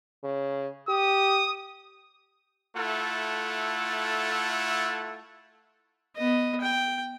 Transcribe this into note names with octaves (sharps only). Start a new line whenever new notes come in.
C#3
G4 D#6
A3 E4 F4 A4 F#5
B3 D#5
G5